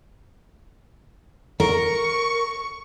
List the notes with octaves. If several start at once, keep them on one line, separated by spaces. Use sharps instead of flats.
A#4 C#6